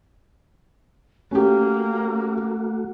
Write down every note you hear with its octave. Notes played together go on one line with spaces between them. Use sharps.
A3 A#3 C#4 F#4 G4